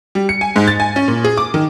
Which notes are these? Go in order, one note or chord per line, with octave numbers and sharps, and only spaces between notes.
G3
C#7
G#5
G#2
A6
G#5
C#4
A#2
G#4
D6
D#3